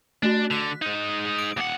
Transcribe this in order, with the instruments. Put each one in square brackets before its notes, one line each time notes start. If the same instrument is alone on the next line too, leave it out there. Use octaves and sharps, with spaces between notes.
[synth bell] A3 F#4 [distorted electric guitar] D4
[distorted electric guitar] D3 [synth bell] F#6 B6
[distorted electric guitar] G#3 D#4
[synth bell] D#6 D7
[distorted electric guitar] D#2 F#5 [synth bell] D6